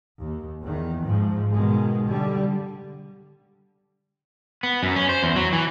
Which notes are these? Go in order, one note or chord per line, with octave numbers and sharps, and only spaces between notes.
D#2
E2 D#3
G#2 F3
B2 D#3 G#3
D3 G3
B3
F#2
C#4
C5
E2
F#3
E3